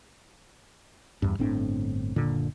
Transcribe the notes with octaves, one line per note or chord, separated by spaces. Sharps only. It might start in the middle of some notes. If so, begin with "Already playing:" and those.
E2 G2
G1 A2 C4 D4
F#1 A#2 D3